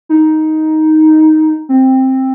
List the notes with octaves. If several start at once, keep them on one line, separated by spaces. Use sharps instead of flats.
D#4
C4